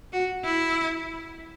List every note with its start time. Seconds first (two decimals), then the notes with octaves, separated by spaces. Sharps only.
0.13 F#4
0.45 E4